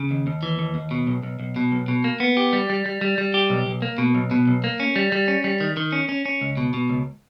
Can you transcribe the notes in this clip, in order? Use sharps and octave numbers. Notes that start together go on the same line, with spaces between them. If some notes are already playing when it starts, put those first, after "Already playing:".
Already playing: C#3
D#2
D#2
E3
D#2
D#2
B2
B1
B1
B1
B2
B1
B2
A#3
B3
G4
G3
G3
G3
G3
G3
G4
B1
B1
A#3
B2
B1
B2
B1
A#3
C#4
G3
G3
C#4
G3
D#3
D#3
C#4
C#4
C#4
C#2
B2
B2
C#2